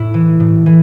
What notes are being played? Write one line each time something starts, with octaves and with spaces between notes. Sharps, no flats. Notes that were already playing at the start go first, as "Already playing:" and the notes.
Already playing: A2 E4
E3
A2
E3